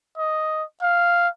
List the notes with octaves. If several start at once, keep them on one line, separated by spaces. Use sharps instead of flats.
D#5
F5